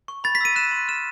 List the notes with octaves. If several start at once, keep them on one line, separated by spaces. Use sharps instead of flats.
C#6
B5 A6
B6
E6 D#7
F#6 E7
C6
F6 E7